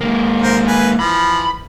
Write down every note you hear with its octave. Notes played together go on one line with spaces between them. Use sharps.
G#3 A#3
A#4 C5
B4 G#5
E3 F3 B5